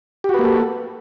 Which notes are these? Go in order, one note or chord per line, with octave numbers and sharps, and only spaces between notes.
A#3 F#4 G4 A4 B4